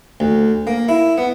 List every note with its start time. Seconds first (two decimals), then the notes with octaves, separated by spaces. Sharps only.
0.20 D2
0.67 A#3
0.89 E4
1.18 B3